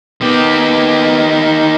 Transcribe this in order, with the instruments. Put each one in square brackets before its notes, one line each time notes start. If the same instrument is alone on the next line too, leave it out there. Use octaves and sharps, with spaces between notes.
[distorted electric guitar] D#3 G4 [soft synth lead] B3